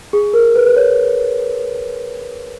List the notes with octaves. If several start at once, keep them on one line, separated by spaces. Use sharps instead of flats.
G#4
A#4
B4
B4
C#5